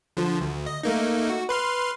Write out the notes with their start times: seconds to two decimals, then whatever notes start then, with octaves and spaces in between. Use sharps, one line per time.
0.17 D3 F3
0.41 D2
0.66 D#5
0.83 A3 A#3 D#4
1.29 F#4
1.49 B4 C6 F6